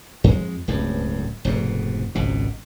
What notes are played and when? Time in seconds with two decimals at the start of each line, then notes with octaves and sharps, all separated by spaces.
0.24 F2 G#3
0.68 D1 C#2 G2
1.45 F1 G#2 B2
2.15 G#1 C#2 B2